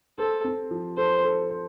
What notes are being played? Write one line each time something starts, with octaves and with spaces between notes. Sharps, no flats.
A4 C5
C4
F3
A4 C5
A4
C5